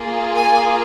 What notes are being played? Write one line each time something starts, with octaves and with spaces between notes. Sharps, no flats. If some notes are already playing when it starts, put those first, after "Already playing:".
Already playing: A#3 F4 G#4
G#5